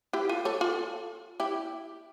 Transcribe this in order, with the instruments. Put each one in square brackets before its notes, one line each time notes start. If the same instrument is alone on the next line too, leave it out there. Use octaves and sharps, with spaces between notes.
[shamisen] E4 G4
F4 A4
A4 C#5
F4 A4
E4 G4